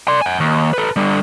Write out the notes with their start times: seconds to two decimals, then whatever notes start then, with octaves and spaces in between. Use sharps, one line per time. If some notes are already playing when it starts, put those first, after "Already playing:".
0.08 D5 C6
0.22 F#5 G#5
0.40 D#2
0.74 A4 B4
0.96 D3 G3